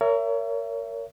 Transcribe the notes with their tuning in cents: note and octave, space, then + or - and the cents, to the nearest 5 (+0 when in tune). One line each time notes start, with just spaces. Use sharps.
A#4 -10 C#5 +30 E5 +35